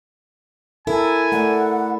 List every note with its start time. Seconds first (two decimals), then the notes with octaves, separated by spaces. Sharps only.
0.87 E4 A4 A#4 G#5
1.32 A3 D5 F#5